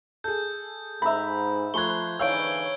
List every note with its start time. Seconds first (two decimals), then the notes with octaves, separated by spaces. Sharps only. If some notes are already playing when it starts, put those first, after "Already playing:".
0.24 G#4 A4 G6
1.02 G#2 E5 A#5 B5
1.74 F3 A3 C6 C#6 F#6 G#6 G7
2.19 G#2 D3 E3 C#5 F5 E6 G6 D7